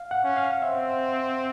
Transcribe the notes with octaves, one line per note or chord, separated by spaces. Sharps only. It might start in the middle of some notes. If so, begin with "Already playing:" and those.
Already playing: F5
F#5
C#4
F5
C4 E5